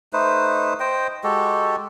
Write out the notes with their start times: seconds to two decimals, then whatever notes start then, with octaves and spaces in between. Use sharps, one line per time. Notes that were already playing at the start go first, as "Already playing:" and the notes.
0.13 A3 D#4 B4 C5
0.80 C5 D#5 G5
1.24 G#3 F#4 G4 A4